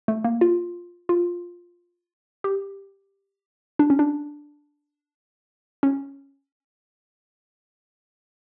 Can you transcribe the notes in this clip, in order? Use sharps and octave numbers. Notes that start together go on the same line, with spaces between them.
A3
A#3
F4
F4
G4
D4
C#4
D4
C#4